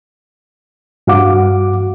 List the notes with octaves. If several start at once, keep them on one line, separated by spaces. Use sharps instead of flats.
G2 F#4 F5 F#5 D6